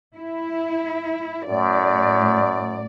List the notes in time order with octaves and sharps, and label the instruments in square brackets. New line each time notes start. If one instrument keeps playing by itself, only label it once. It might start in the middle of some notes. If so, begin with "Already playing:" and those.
[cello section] E4
[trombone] F#2 [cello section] A2 D5